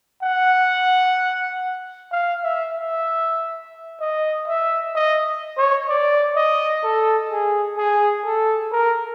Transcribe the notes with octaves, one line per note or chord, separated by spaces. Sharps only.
F#5
F5
E5
E5
D#5
E5
D#5
C#5
D5
D#5
A4
G#4
G#4
A4
A#4